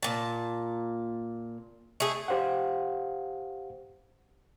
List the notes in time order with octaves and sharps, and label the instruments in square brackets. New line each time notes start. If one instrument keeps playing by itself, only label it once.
[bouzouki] A#2 A5
A3 G#4
[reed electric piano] G4 C5 F5 F#5